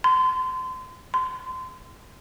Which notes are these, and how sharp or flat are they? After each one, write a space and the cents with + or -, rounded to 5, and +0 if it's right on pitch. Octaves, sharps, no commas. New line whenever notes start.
C6 -30
C6 -25